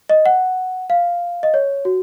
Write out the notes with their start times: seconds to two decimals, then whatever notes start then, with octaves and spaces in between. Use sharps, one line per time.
0.09 D#5
0.26 F#5
0.90 F5
1.43 D#5
1.54 C#5
1.85 F#4